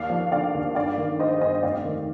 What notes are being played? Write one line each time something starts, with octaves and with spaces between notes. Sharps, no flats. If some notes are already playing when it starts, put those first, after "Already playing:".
Already playing: D#2 D5 F5
F3
D3 D5 F5
D#2
G1 D5 F5
D#3
G2 C5 D#5
G1 C5 D#5
F1 D5 F5
D#3